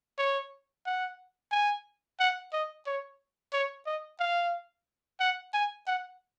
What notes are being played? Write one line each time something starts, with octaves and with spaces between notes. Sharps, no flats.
C#5
F#5
G#5
F#5
D#5
C#5
C#5
D#5
F5
F#5
G#5
F#5